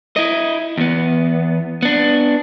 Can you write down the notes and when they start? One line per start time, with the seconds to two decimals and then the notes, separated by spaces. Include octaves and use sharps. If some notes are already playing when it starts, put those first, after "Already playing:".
0.16 E4 D#5
0.78 E2 B3
1.82 B3 D4